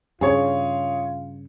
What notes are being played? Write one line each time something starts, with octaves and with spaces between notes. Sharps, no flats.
G2 C#3 F4 G#4 C#5